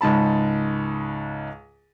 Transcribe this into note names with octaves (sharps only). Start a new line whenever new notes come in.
C#2 G#2 A5 B5